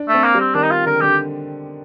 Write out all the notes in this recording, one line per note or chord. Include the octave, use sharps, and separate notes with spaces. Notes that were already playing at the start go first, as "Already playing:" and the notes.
Already playing: D4
A3
C4
A#3
G3
C4
D#3 D4
D#4
F4
D3 A#4
D#3
D3 G4